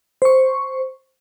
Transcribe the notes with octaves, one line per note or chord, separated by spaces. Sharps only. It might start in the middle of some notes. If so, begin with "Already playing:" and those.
C5 C#6